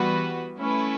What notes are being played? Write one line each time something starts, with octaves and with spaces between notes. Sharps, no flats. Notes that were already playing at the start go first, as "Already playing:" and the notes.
Already playing: E3 G3 B3 F#4 B4
A3 C#4 E4 B4